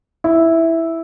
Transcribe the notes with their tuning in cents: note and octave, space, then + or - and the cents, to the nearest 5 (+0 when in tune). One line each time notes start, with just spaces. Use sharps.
E4 -5